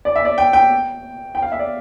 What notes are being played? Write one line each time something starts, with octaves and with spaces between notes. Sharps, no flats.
D5
E5
D5
G5
G5
G5
F5
E5
D5